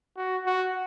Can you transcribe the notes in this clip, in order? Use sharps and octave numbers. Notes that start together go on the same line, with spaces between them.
F#4
F#4